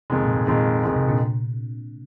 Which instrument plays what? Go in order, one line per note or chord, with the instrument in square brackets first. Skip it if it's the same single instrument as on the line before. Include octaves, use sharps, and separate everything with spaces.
[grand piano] F2 D#3 G#3 [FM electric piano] C3
[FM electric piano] A#2
G#2
[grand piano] F2 D#3 G#3 [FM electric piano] A#2
[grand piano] F2 D#3 G#3
[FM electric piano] G#2 C3
A#2 D3